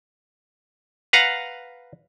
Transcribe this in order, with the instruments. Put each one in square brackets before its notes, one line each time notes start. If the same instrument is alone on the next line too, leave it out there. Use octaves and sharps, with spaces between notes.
[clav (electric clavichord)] B4 F5 F#5 A#5